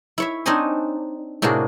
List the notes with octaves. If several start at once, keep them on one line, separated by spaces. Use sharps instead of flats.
E4 C#5 E5
C4 D4 D#4 C#5 D#5 G#5
A2 C3 A#3 D4 F#4 G#4